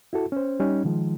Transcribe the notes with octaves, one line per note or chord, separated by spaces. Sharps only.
E4 F#4 A4
C#4 C5
G3 C#4 D#4
D#3 F3 G#3